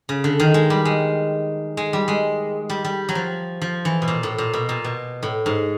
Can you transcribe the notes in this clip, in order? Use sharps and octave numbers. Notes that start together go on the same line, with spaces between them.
C#3
D3
D#3
G#3
G3
G#3
G#3
G3
G#3
G3
G3
F#3
F3
F3
E3
B2
A#2
A2
A#2
B2
A#2
B2
A2
G#2